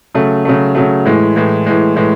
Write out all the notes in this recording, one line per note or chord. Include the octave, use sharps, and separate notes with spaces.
C#3 F#3 A3
C#3 F#3 A3
C#3 F#3 A3
A2 E3 G#3
A2 E3 G#3
A2 E3 G#3
A2 E3 G#3